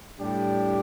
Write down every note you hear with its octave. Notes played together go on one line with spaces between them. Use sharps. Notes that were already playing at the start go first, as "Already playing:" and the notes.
A2 G3 D4 G4